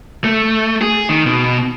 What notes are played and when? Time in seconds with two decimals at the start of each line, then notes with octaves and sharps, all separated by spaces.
0.24 A3
0.81 G#4
1.09 D#3
1.26 B2